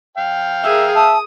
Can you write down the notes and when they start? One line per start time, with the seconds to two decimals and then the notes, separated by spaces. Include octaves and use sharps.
0.18 F5 G5
0.64 G#4 A#4 E5
0.95 E5 A5 D#6